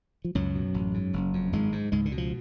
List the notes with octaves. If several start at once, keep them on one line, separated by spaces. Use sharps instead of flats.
F3
C#2 F#2 F#3
B2
A1
G#2
F#1
F2
G#1 G#2 G#3
G#2
C#2 G#2 G#3
D3
B2
F3